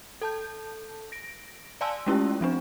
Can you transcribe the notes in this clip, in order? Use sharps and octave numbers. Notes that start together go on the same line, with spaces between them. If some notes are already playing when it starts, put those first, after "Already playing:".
A4 A5 G6
A#6 D7
D5 F5 G#5 A5 C6 E6
G#3 A3 C#4 E4 F4 G4
F3 C4 D4